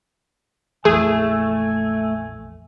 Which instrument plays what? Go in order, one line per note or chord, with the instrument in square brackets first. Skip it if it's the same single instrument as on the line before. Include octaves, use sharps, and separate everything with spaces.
[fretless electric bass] A#1 F2 E3 [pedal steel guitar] A3 [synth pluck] G#4 [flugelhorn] G#5